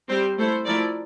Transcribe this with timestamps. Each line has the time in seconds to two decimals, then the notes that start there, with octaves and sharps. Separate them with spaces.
0.09 G3 C4 G4 C5
0.38 A3 E4 A4 C5
0.66 F3 A3 E4 A#4 D5